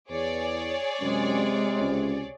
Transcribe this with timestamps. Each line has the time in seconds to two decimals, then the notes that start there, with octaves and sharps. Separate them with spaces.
0.10 E2 G#4 C#5 D5
1.01 F#2 C3 G#3 C4
1.80 C#2